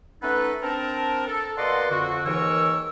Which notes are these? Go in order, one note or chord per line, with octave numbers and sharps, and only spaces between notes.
A3 B3 C#4 D#4 A4 B4
C4 D4 A#4 A5
A4
B2 A#3 D5 D#5 F#5 C6
F2 D3 F#4
D#2 G#2 E3 A#4 C#5 E6